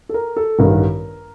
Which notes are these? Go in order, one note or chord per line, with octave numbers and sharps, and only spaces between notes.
A4
A#4
A4
A1 G2 D#3 A#4